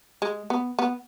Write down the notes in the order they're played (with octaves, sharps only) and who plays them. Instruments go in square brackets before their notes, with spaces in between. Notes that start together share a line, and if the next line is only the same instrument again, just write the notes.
[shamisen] G#3
B3
B3